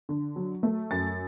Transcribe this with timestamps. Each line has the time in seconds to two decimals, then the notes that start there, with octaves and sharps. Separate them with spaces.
0.09 D3
0.36 F#3
0.63 A3
0.91 F#2 A6